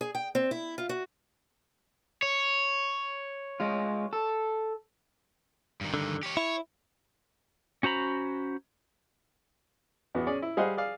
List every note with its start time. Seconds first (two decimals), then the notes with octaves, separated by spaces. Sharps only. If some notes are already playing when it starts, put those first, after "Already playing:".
0.01 G#4
0.15 G5
0.35 C4
0.51 E4
0.78 F4
0.89 F#4
2.22 C#5
3.60 G#3 F4
4.13 A4
5.81 G2 D#3
5.94 D3
6.23 G4 C#5
6.37 E4 C#5
7.83 C#4 F#4 C5 A#5 B5
10.15 E2 B3 F#4
10.27 C#4 G#4 D5
10.42 E4
10.57 G3 G#4 C5 D#5 F5 F#5
10.77 G#4 D5 F5